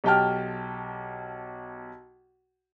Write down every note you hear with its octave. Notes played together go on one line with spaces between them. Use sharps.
B1 G4 G5 A5 F6